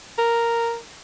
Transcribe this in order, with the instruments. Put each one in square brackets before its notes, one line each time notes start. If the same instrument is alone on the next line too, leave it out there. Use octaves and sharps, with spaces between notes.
[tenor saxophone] A#4